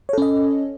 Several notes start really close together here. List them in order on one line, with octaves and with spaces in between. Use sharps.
C#5 A4 C#4 D#5